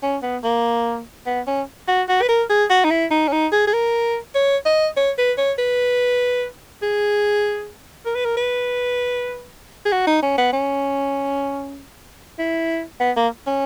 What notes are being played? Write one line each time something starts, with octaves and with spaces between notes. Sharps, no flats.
C#4
B3
A#3
B3
C#4
F#4
F#4
B4
A#4
G#4
F#4
D#4
E4
D#4
C#4
D#4
G#4
G#4
A#4
C#5
D#5
C#5
B4
C#5
B4
G#4
A#4
B4
A#4
B4
G#4
F#4
D#4
C#4
B3
C#4
E4
B3
A#3
C#4